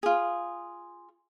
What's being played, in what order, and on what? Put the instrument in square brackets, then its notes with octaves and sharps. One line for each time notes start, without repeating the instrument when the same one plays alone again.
[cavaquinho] F4 G#4